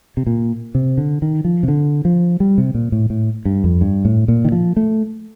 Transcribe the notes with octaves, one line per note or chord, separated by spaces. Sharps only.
C3
A#2
C3
D3
D#3
F3
C3
D3
F3
G3
C3
A#2
A2
A2
G2
F2
G2
A2
A#2
D#3
F3
A3